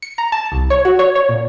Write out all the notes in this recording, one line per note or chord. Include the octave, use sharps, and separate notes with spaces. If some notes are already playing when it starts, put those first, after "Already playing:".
C#7
A#5
A5
C2
C#5
F#4
C#5
C#5
A#2